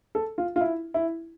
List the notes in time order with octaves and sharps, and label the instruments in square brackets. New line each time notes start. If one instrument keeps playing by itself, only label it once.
[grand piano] A4
F4
F4
E4
E4